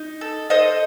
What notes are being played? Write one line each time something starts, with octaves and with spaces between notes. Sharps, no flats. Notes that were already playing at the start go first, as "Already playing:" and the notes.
Already playing: D#4
A4
A4 C5 D#5